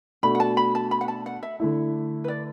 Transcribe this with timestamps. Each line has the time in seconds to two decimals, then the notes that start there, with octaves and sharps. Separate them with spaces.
0.23 B2 A3 D4 F#4 B5
0.35 F#5
0.40 A5
0.57 B5
0.75 A5
0.91 B5
1.01 F#5
1.08 A5
1.26 F#5
1.43 E5
1.60 D3 A3 E4
2.24 B4
2.28 D5